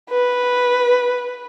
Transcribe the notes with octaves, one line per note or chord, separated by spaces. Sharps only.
B4